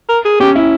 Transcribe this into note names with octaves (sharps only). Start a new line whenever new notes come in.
A#4
G#4
C#4 G4
E4